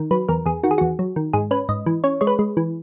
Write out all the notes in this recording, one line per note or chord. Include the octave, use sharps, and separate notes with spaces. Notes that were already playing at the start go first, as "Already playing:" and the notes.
Already playing: D#3
F#3 B4
E2 A#4
E2 G#4
D#3 F#4
G#4
E2 F#4
F#3
D#3
G#2 G#4
C#4 B4
G#2 D#5
E3
C#4 C#5
G#3 C#5
B4
G#3
E3